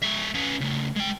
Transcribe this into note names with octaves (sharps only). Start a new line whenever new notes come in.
G#3 E5
C#4 B4
C#3 A3
G#3 G5